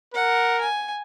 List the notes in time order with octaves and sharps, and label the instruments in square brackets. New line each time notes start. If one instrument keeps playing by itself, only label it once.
[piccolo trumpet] A#4 [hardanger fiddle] F#5
[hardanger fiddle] G#5